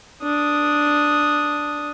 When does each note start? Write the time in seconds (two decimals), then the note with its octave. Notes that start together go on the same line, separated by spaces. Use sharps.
0.22 D4 D#6